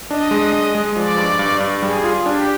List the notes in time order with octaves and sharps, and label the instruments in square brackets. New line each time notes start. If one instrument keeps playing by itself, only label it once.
[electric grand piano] D4 [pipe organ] D#5
[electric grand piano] G#3
G#3
G#3
[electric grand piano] F3 [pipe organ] D5
[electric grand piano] G2
G2
G2
[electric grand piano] G3 [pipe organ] G#4
[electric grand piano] F4
[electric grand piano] D4 [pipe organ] G4